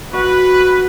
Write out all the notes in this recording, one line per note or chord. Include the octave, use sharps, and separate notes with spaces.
F#4 B4